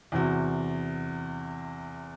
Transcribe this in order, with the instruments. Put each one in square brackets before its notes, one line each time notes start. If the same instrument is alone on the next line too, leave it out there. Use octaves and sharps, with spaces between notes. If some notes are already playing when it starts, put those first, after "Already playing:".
[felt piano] E2 C3 F#4